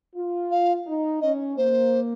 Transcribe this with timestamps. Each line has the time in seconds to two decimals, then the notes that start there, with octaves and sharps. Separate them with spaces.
0.15 F4
0.51 F5
0.87 D#4
1.21 C#4 D#5
1.57 A#3 C5